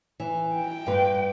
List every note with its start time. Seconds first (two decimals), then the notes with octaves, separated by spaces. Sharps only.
0.20 E3
0.55 G5
0.86 G2 B4